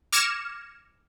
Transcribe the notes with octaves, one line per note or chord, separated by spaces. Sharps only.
D6 F6 G#6 A#6 C#7 E7